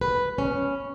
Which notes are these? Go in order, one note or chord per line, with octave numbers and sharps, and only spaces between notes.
B4
C#4